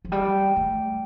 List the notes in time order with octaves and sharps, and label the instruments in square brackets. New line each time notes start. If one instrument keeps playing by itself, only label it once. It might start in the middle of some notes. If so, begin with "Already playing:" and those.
[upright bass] F3
[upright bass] G3 [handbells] G5
[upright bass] A3